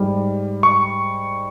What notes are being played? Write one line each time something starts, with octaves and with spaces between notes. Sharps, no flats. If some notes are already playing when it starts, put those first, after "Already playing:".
Already playing: G#2 G3
C#6